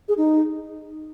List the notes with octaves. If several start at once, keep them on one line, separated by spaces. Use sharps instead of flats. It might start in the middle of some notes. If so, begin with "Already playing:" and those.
G#4
D#4